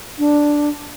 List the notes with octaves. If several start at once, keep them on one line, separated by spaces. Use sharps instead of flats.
D4